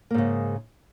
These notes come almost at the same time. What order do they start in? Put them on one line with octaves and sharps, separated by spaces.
A#3 G#2 C#3